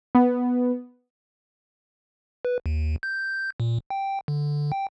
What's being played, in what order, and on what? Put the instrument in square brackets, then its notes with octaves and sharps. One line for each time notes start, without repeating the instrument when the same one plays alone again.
[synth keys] B3
[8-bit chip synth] B4
D#2
G6
A#2
G5
D3
G5